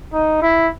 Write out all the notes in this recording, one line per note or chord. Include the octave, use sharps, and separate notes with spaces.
D#4
E4